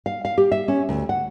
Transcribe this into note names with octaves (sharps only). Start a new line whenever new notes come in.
F5
F5
G4
E5
C#4
D2
F#5